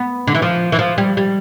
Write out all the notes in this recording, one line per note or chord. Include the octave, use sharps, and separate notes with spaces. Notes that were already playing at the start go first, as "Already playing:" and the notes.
Already playing: B3
D3
E3
F3
E3
F3
G3
G3